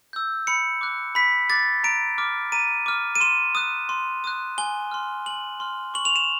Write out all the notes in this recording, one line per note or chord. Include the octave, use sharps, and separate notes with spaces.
E6 G6
B5 C#7
D6 F#6
B5 B6
D6 F#6 A6
A#5 D7
D6 F6
A#5 D#7
D6 F6
D#7
C6 E7
D#6 F#6
C6
D#6 F#6
G#5 G7
C6 F6
G#5 F#7
C6 F6
C#6 F#7
F7
E7